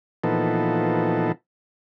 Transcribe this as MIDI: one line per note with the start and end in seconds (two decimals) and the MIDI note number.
0.24 1.32 46
0.24 1.32 52
0.24 1.32 53
0.24 1.32 59
0.24 1.32 63
0.24 1.32 69